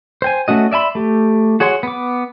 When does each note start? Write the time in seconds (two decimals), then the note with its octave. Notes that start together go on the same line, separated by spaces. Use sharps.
0.22 C5 G5 G#5
0.48 A3 C#4 F#4 D#5
0.72 D5 E5 G#5 B5 C6
0.95 A3 G4
1.60 F#4 G#4 C#5 F#5 C6
1.83 B3 D6